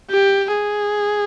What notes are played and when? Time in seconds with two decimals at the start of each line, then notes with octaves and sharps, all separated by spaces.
0.11 G4
0.53 G#4